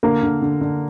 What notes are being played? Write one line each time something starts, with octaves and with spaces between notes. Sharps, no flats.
D3 A#3 A#4
D3
D3
D3